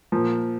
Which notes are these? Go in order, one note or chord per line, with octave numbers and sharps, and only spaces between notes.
A#2 F3 A#3